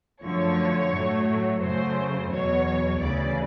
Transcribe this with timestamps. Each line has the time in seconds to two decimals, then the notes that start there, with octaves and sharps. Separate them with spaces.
0.22 F#2 D3 F3 A3 C#5
0.92 A2 F#3 A3
1.61 F#2 C#3 F#3 A3 C5
2.30 E2 B2 F#3 C#5
2.99 D2 C#3 E3 D5